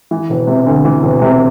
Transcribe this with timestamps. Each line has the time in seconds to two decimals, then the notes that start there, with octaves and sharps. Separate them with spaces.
0.11 E3
0.30 E1
0.47 C3
0.66 D2
0.85 E3
1.03 E1
1.22 C3